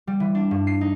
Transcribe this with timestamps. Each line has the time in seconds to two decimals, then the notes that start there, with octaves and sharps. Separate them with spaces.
0.07 G3
0.20 E3
0.35 D4
0.51 G2
0.67 C7
0.81 D#4